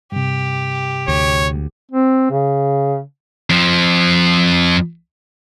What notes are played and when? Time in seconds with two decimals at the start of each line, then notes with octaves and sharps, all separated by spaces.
0.12 G2 C3 G4
1.08 D2 C#5
1.91 C4
2.31 C#3
3.50 F2 F3